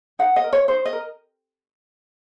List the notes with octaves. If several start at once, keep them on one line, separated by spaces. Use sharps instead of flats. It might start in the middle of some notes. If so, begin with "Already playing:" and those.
D#4 F#5
D#5
A#4
C#5
D#4 C5
D#5
A#4